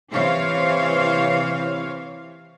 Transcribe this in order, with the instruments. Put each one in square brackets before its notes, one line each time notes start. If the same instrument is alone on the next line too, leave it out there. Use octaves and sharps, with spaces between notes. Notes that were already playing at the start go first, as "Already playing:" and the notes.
[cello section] C3 E3 C5 C#5 F5